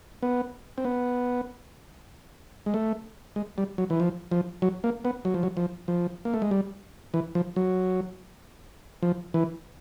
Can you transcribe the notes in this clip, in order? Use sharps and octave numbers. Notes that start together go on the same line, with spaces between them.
B3
C4
B3
G#3
A3
G#3
G3
F#3
E3
F3
F3
F#3
A#3
B3
F#3
F3
F#3
F3
F3
A#3
A3
G#3
G3
E3
F3
F#3
F3
E3